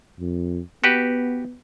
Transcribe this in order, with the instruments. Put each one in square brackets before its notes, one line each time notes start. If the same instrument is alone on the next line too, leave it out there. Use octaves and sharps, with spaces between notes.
[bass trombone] F2
[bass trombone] B3 [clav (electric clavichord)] F#4 G4 B4